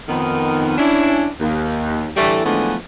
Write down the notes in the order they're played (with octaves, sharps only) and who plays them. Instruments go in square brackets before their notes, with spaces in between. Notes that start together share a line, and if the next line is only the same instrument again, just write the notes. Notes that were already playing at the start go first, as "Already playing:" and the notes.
[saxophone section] F2 D#3 B3
C#4 D4 E4
D#2
A2 D3 E3 G3 A3
D3 E3 F3 G#3 A3 B3